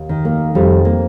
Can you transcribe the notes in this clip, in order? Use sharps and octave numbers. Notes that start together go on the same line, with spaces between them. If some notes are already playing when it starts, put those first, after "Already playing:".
Already playing: D#2
D#3
A#3
F2 G3
A#3